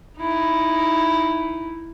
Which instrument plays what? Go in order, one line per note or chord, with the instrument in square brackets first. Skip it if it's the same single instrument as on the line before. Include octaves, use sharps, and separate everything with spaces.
[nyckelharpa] D#4 E4